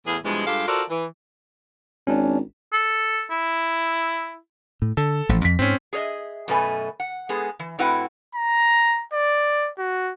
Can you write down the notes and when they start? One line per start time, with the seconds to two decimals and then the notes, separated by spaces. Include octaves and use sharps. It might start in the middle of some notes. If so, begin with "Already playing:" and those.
0.06 E2 A2 E3 G#4
0.23 G2 B2 E3 F3 G#3
0.46 G2 G#3 F4 G4 A4 F5
0.67 F4 F#4 A4 A#4 C5 D5
0.90 E3
2.07 G#1 C#4 D4
2.73 A4
3.31 E4
4.82 A2
4.97 D3 A4
5.29 A1 F3
5.45 F2 B6
5.59 G#2 C4 C#4
5.93 G#4 A4 C#5 D#5 E5
6.48 F#2 B2 A3 B4 G#5
7.00 F#5
7.29 G#3 B3 G#4 A4
7.59 E3
7.79 A2 C4 E4 F#4 B4 F#5
8.35 A#5
9.14 D5
9.79 F#4